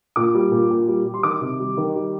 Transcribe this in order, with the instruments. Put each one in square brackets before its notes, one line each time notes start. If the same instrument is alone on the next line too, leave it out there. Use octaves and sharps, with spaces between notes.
[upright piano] A#2 D6
G3
A#2
A#2
G3
G3
C6
D#3 D6
C3
G3
D#3
G3